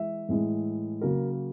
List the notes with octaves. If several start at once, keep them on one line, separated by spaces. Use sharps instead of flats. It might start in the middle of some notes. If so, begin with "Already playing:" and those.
Already playing: E3 G#3 E5
A2 E3 G#3
C#3 F#3 A#3 A#4